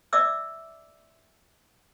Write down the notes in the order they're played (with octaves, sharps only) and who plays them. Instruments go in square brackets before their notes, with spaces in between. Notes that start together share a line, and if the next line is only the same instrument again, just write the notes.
[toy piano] D5 E5 D6 E6